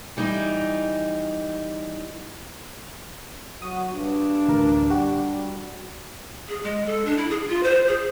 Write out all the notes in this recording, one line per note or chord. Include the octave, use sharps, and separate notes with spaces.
E3 G3 D#4
F#3 F#4 D#6
G2 D4
A1 D2 A#4
G3 F#4 G4
G#4
G#3
A4
D4
E4
G#4
F4
C5
G#4